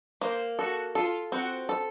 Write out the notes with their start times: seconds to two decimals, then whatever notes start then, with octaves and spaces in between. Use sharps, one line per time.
0.21 A#3 C5
0.59 F#4 A4
0.95 F4 A4
1.32 C4 F#4
1.69 A4